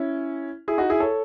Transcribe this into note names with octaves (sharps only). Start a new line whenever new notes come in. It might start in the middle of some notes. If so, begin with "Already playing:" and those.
Already playing: C#4 E4
E4 G#4
D#4 F#4
E4 G#4
A4 C#5